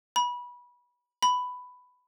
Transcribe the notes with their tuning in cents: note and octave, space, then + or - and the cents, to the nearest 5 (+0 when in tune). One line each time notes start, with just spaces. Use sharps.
B5 -20
B5 +10